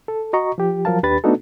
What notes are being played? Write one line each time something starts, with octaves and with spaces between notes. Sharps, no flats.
A4
F#4 D#5 A#5 C#6
F3 G4
F3 F#3 A#4 F5 A5
D#2 D4 G4 B4 B5 A6
A3 B3 D4 D#4 F#4 A4